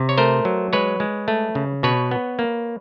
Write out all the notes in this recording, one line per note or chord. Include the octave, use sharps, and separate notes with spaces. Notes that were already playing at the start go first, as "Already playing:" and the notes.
Already playing: C3
C#5
A3 A#4 C5
F#3
G#3 B4 C#5
G#3
A3
C#3
B2 B4 C#5
B3
A#3